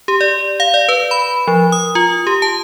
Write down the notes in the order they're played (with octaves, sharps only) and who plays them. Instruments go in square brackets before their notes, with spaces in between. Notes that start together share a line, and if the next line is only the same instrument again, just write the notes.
[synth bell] G4
D5
F5
D5
B4
B5
F3
D#6
F4
G4
A5